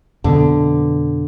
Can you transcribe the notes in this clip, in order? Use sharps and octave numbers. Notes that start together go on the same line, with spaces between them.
F2 B2 D3 B3